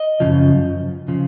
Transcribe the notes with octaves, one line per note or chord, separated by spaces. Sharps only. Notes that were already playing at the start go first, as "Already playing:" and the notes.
Already playing: D#5
F#2 C#3 F3
C#3 F3